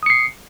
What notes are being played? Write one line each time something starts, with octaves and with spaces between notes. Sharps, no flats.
D#6 C7 C#7